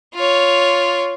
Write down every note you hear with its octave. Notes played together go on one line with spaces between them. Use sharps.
F4 C#5